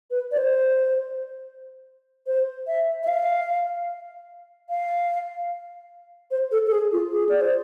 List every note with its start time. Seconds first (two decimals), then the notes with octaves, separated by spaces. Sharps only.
0.11 B4
0.31 D5
0.37 C5
2.27 C5
2.67 E5
3.03 E5
3.08 F5
4.70 F5
6.31 C5
6.52 A4
6.67 A4
6.72 G#4
6.92 F4
7.12 G#4
7.29 D5
7.41 C5